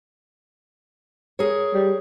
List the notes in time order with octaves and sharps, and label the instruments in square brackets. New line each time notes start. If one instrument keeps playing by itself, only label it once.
[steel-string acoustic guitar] G#4 A#4 C#5
[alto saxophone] G3